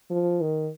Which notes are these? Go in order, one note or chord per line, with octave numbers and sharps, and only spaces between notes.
F3
D#3